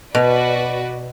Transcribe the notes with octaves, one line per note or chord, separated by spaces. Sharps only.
B2 F#4 B4 D5